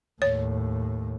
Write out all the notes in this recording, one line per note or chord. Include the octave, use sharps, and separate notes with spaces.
D#2 A2 C#5